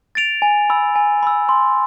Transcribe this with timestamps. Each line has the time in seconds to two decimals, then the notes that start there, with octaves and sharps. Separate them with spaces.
0.15 A6 D7 F7
0.42 G#5
0.70 B5 E6
0.96 G#5
1.23 B5 E6
1.49 C6